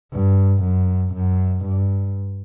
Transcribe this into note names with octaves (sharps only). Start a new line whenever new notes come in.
G2
F#2
F#2
G2